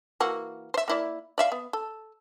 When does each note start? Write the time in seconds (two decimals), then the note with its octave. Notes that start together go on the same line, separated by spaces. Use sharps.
0.20 E3 A#3 F#4
0.74 C5 E5
0.88 A#3 E4 D5
1.38 D5 E5 F5
1.52 B3
1.73 A4